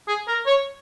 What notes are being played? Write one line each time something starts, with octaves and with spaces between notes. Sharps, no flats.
G#4
A#4
C#5